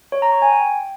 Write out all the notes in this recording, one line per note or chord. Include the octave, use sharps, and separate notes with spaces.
C#5
A#5
C#6
G#5
G5